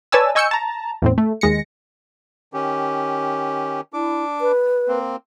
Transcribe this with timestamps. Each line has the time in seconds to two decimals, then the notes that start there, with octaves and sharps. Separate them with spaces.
0.12 B4 C#5 D5 G#5 A5 E6
0.35 D#5 G#5 C#6 E6 G6 C#7
0.51 A5 A#5
1.02 E2 A2 C4
1.18 A3
1.41 D#2 G#3 A#6 C#7
2.54 D#3 C#4 G4
3.93 D4 E4 D6
4.41 B4
4.88 A#3 C4